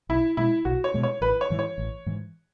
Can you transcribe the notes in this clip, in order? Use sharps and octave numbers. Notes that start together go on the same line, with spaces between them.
B1 E4
B2 G#3 E4
B1 F#4
C#5
B2 G#3
C#5
A1 B4
C#5
G#2 E3
C#5
A1
G#2 E3